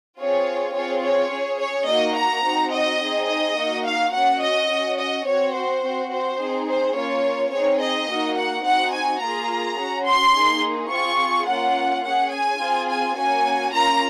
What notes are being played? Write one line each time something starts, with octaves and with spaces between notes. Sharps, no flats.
C4 F4 G#4 C#5
C4 F4 G#4 C#5
C#5
C#4 G#4
C#5
A#3 D#4 F#4 D#5
A#5
C4 D#4 F#4
D#5
C4 D#4 G#4
D#5
A#3 D#4 F#4
F5
C#4 F#4 F#5
D#5
C#4 F#4
D#5
C4 F#4 C#5
C5
C4 F#4
C5
C4 D#4 G#4
C5
A#3 C#4 F4 C#5
C4 D#4 G#4 C#5
D#5
A#3 D#4 F#4
F#5
C4 D#4 F#4 F#5
G#5
A#3 F4 G#4 A#5
C#4 F#4
C6
A#3 D#4 G#4
C4 F4 G#4 C#6
A#3 C#4 F4 F#5
C#4 G#4 F#5
G#5
C4 F4 G#4
G#5
A#3 C#4 F#4 G#5
A#3 C#4 F4 A#5